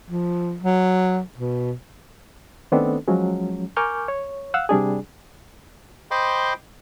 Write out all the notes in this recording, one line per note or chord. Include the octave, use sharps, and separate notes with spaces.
F3
F#3
B2
D#3 A3 B3 C4 D4 A4
F3 F#3 G#3 C#4
A#4 G#5 C#6 D6 F6 G6
C#5
F5 F#5 E6 F#6
C3 G3 D4 G#4
C5 D#5 G5 B5 C6 D6